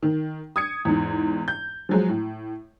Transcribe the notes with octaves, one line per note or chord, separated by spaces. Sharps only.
D#3
D#6 G#6 C#7
E2 G#2
G6
F3 F#3 G#3
A2